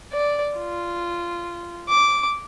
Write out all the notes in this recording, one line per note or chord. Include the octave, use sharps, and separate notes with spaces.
D5
F4
D6